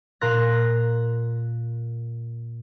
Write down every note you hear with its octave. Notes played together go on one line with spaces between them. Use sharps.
A#2 A#4 C6 F#6 A#6